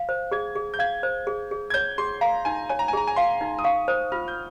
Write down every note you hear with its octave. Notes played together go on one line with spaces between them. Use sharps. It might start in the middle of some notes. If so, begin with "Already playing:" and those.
Already playing: F5
C5
G#4 G#6
G#4
G6
F5 G#6
C5
G#4
G#4
G#6
C#5 G6
G#4 C6
F5 A#5
D#4 G#5
C#5 G#5
A#5
G#5
G#4 A#5
G#5
F5 C6
D#4
D#6
F5 C#6
C5 D#6
F4 F6
G6